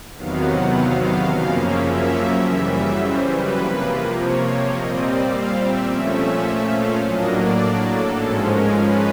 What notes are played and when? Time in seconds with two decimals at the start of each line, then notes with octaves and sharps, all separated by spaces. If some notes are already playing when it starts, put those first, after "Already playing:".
0.16 E2 C3 D#3 F#3 B3 F5
0.45 F#5
0.73 F5
1.02 F5
1.31 F#2 C#3 F3 A#3 C#4 F5
1.59 E5
1.88 E5
2.45 F#2 C#3 E3 G3 E5
2.74 E5
3.03 C5
3.31 B4
3.60 C3 F3 A#3
4.17 C#5
4.46 C#5
4.74 A#2 G3 C4 D#5
5.03 D5
5.32 F5
5.61 E5
5.89 A#2 F3 A3 C#4 E5
6.18 E5
6.46 E5
6.75 F5
7.03 A2 F#3 A#3 D4 D#5
7.31 D5
7.90 A4
8.18 G#2 F3 G#3 C#4 A4
8.47 A#4
8.76 B4